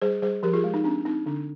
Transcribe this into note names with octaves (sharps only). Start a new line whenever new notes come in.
G3 G#4 C5
G3 G#4 C5
F3 G4 A#4
F4 G#4
G#3
D#4
C4 D4
C4 D#4
D3 D4